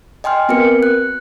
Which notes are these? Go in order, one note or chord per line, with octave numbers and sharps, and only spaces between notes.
D#5 G5 G#5 C6 F6
B3 C4 F#4 A#4 B4 C#7
F#6